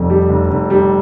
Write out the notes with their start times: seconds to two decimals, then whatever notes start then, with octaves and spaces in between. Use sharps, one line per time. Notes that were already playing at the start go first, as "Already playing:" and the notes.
Already playing: F1 F2
0.10 G3
0.30 F1
0.50 F1
0.70 G3